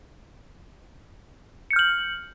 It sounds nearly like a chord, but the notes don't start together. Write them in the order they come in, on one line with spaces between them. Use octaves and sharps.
C#7 G6 F6 F#7